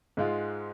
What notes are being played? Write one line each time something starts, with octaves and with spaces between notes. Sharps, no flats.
G#2 G#3 F4